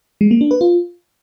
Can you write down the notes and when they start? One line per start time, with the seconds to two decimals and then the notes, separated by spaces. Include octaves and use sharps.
0.21 G#3
0.31 A#3
0.41 D4
0.51 B4
0.61 F4